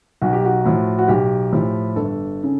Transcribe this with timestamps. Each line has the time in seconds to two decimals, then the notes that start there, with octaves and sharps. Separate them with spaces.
0.22 B1 F#4
0.33 G4
0.45 F#4
0.65 A2 F3
0.99 F#4
1.08 B1 G4
1.52 A2 F3
1.96 G1 A4
2.43 C#3